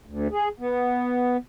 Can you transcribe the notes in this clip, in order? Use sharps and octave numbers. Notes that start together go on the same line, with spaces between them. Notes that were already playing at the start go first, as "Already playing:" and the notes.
D2
G#4
B3